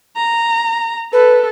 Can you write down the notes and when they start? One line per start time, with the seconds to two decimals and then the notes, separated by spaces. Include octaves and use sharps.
0.16 A#5
1.13 A4 B4